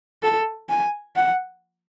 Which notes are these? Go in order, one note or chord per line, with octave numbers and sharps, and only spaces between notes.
A4
G#5
F#5